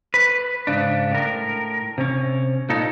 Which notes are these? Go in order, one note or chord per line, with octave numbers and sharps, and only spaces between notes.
B4
G#2 C#3 D4
A2 A#4
C3 C#4
A#2 D#4 A4